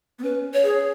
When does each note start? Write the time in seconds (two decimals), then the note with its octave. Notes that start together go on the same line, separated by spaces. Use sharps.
0.19 B3
0.23 C#4 B4
0.54 C#5
0.64 G#4